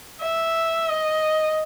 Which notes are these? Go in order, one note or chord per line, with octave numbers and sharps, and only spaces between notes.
E5
D#5